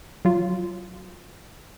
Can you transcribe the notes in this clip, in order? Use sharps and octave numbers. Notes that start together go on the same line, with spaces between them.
F#3 F4